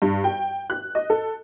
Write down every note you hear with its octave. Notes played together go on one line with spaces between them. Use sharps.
G2
G5
F#6
D#5
A4